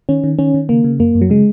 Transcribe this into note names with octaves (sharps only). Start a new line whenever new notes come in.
D#3 C#4
D#3
D#3 C#4
D#3
C#3 A#3
C#3
F#2 A#3
F#2
F#3
C#3 G#3